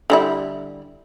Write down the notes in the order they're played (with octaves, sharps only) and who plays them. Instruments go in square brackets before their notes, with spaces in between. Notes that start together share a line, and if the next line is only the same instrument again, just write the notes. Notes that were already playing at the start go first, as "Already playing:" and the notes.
[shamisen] D3 G3 E4